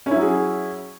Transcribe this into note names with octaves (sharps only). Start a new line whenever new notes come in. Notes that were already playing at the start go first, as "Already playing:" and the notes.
F#3 C#4 E4 G#4